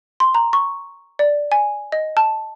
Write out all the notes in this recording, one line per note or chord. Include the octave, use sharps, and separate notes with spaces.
C6
A#5
C#6
D5
G#5
D#5
A5